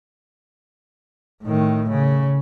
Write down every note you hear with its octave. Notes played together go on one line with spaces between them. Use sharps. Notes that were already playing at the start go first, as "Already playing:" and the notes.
A2 D#3
C#3